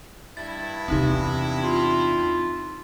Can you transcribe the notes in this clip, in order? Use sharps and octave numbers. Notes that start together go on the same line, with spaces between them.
G2 E4 A6
E2 C3 C4 D#4 G4
F4